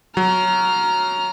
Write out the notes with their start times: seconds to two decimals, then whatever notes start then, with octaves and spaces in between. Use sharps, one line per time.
0.17 F#3 A#5 F6